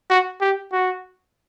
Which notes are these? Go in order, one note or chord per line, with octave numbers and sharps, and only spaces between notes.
F#4
G4
F#4